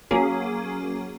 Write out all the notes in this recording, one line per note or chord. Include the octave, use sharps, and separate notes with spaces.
F#3 A#3 C#4 G#4